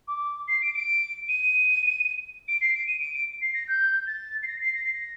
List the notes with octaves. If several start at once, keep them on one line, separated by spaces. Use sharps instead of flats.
D6
C7
D7
D7
D#7
D7
C7
D7
D#7
D7
D7
C7
A#6
G6
A6
C7
A#6
C7
A#6
C7
A#6